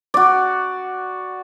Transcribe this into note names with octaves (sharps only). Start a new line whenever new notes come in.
F#4 D5